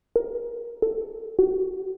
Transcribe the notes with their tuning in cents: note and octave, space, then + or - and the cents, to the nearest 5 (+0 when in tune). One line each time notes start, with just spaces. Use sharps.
A#4 +25
A4 +25
F#4 +45